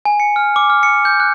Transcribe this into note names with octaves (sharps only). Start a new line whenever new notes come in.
G#5
C#7
F6
D6
F6
C#7
G6
F#6